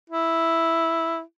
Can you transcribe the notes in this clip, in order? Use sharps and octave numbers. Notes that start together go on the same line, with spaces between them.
E4